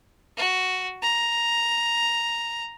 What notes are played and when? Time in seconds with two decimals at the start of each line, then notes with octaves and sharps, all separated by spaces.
0.37 F#4
1.02 A#5